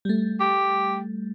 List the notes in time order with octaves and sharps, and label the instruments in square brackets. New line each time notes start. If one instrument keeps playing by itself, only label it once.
[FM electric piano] G3 A3
[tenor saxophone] G4